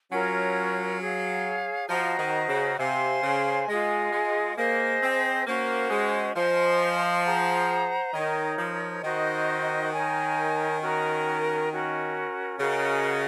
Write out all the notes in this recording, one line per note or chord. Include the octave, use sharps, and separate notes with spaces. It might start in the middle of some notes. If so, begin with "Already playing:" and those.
F#3 C#4 F4 A#4 C#5
G#4 C#5 F5
F3 F#4 C5 D#5 A#5
D#3
C#3
C3 C5 F5 G#5 C6
C#3
G#3 F4 G#4 D#5
G#3
A#3 G#4 C5 D#5
C4
A#3 C#4 F#4 C5
G#3
F3 C5 D#5 G#5 C6
G#4 C5 F#5 A#5
D#3 D#4 A#4 C#5
F3
D#3 D#4 F#4 C5 D#5
D#4 A#4 C#5 G#5
C#4 F#4 A#4
C#4 F#4 A#4
C#3 F#4 A#4 D#5 F#5